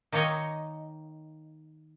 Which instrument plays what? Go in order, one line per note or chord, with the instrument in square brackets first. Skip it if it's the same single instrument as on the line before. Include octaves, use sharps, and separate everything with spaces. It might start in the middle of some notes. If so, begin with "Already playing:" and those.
[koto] D#3 A#3 D#4 C#5 D#5